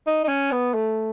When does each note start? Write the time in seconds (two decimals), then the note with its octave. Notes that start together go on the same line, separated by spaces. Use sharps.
0.07 D#4
0.24 D#4
0.28 C#4
0.52 B3
0.74 A3